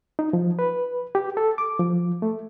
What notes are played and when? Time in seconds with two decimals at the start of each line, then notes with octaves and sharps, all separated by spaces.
0.19 D#4
0.33 F3
0.59 B4
1.15 G4
1.37 A4
1.58 D6
1.79 F3
2.22 A3